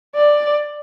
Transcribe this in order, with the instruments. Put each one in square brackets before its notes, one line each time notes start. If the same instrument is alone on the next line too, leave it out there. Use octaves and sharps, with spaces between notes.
[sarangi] D5